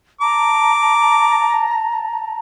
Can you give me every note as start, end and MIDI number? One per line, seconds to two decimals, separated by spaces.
0.21 2.39 81
0.21 2.39 82
0.21 1.73 86